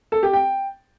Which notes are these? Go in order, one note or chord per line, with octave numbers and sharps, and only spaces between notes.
A4
G4
G5